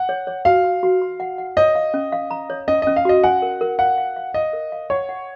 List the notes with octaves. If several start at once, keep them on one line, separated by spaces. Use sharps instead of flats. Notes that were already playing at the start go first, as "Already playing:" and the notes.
Already playing: F#5
C#5
C#5
F#4 F5
F#4
F#4
C6
F#5
F#5
C#5 D#5
F5
C#4
F5
A#5
C#5
C#4 D#5
C#4 D#5
F5
F#4 D#5
F#5 G#5
A#4
A#4
F5 F#5
F5
F5
D#5 F5
A#4
F5
C#5 F#5
F#5